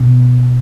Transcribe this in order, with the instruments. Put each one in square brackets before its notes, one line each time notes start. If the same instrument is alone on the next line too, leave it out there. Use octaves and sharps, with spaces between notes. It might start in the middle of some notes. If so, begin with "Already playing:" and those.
Already playing: [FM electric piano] B2